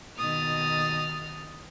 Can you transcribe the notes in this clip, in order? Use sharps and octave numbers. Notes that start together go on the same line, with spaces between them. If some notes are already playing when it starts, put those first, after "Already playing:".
B2 D#3 D#6 F6 A6